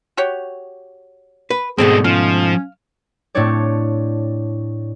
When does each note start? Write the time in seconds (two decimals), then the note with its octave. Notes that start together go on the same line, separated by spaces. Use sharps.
0.17 F#4 G4 C#5
1.50 B4
1.78 G#2 B2 D3 G#3 A3 C4 G#4
2.04 F3 C#4 F5
3.35 A2 A3 C4 D4 C#5 D5